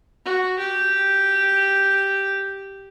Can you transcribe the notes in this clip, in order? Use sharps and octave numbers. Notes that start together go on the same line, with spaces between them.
F#4
G4